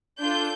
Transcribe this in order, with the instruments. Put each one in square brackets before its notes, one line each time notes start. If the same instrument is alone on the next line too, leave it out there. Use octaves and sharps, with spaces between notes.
[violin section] D4 F4 A4 G6